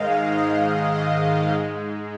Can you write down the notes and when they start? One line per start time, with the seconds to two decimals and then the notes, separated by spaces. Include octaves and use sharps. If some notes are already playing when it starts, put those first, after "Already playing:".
Already playing: G#2 D#3 G#3 D#5 F5
0.36 F5
0.93 D#5
1.52 G#2 G#3